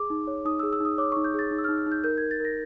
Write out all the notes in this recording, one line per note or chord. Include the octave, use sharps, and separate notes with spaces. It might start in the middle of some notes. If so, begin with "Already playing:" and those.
Already playing: G#4 D6
D#4
C#5
D#4 D#6
G#4 E6
E6
D#4 D#6
C#5 D6
D#4 C#6
G6
G#4 A6
D#4
E6
D#4 F6
F6
D#4
G6
A#4 G6
A#4 G#6
A6
A#4 A#6